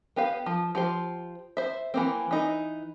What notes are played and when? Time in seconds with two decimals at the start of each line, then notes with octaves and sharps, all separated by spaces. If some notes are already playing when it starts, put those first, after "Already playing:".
0.16 B3 G4 B4 F5
0.46 F3
0.75 F3 G4 C5
1.57 C5 E5
1.94 E3 A#3 C4
2.31 E3 D#4